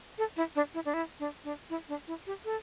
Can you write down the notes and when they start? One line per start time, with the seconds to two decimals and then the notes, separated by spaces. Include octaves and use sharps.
0.18 A4
0.36 E4
0.55 D4
0.74 E4
0.85 D4
0.94 E4
1.19 D4
1.44 D4
1.70 E4
1.88 D4
2.07 E4
2.26 G4
2.45 A4